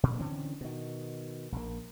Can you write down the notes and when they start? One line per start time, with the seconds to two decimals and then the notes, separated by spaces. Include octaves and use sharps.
0.03 A#2
0.19 D3 E3 C4 C#4
0.61 B2 D#3
1.52 A#1 A#3